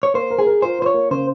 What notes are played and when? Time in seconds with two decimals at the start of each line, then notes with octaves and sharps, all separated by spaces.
0.03 C#5
0.14 A#3 C5
0.30 A#4
0.39 G#4
0.46 A#4
0.62 F4 C5
0.79 F4 C5
0.86 C#5
0.94 A#3
1.11 C#3 C5